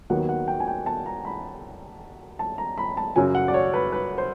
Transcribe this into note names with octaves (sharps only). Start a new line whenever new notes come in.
D#2 D#3 F#3 B3 F#5
F#5
G5
G#5
G5
A5
A#5
B5
A5
A#5
B5
A5
F#2 C#3 F#3 G#5
F#5
D5
C#5
B4
B4
C5